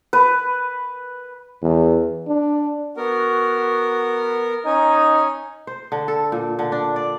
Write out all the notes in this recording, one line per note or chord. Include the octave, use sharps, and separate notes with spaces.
B4
E2
D4
B3 F#4 A#4
C#4 D#4 G#5
C5
D3
A4
A#2
D3
D4
D5